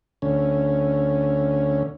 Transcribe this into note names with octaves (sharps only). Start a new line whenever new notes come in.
D2 C#4